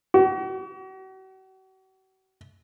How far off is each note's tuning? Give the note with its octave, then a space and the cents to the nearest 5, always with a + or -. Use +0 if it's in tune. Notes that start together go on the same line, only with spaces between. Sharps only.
F#4 +45